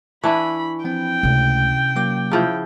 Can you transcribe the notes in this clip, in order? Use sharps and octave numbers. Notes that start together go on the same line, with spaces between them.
E3 D4 E4 B5 C#6
F3 C4 G5
C#2 C3 A3 C#4
F#3 A#3 D6
C#3 F3 E4